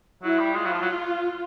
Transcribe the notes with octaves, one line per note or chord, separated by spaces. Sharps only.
F#3 E4
G3
G#3 F4
F#3
F3
F#3